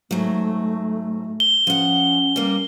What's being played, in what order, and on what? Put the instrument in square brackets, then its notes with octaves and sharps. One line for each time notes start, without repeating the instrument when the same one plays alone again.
[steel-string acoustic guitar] G#2 F#3 [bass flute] A3
[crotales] G7
[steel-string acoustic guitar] F3 F#5 [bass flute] C#4
[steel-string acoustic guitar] G3 A#3